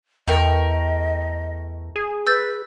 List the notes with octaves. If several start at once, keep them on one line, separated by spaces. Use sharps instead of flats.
E2 A3 A#4 D#5 G5
G#4
B4 E6 G6 A6